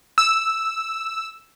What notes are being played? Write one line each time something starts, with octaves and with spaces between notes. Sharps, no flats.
E6